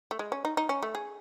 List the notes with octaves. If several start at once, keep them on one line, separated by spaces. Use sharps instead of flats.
A3
G#3
C#4
D#4
D#4
C#4
A3
G#4